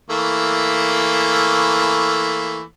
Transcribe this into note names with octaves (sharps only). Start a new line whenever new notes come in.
E3 A3 A#3